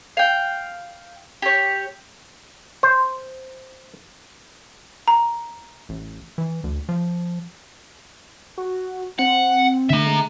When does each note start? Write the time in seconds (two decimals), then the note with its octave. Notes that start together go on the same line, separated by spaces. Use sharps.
0.17 F5 G5
1.42 G4 C#5
2.83 C5
5.08 A#5
5.89 A1
6.38 E3
6.64 D2
6.89 F3
8.58 F#4
9.19 C4 F#5
9.90 D3 A3 E5 A#5
10.06 G#3